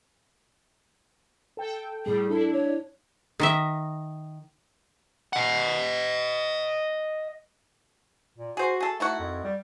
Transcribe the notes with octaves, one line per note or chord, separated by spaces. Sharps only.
A4 G5
A2 G3 G#4
D4 E4 A4
C#5
D#3 D#5 E5
D#5 F#5
A#2
F#4 G#4 C5
G#4 A4
D#3 A3 E4 F#4
F2
G3